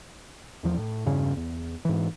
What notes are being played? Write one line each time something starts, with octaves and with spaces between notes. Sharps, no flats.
E1 E2 F3
A2
E2 G2 C#3 C#4
E2
G#2 E3